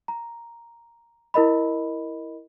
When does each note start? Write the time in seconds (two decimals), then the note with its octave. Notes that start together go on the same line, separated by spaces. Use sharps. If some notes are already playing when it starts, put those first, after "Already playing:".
0.08 A#5
1.34 E4 A#4 D#5 B5